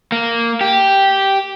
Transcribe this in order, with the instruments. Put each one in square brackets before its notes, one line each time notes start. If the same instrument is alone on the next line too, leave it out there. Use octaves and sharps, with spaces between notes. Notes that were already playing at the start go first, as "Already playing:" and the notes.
[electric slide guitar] A#3
G4